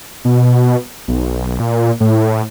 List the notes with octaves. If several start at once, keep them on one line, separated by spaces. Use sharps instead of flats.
B2
B1
A#2
A2